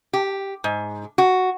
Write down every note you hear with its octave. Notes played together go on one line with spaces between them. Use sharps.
G4
G#2
F#4